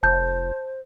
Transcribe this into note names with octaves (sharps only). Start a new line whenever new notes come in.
F1 C5 A5 G6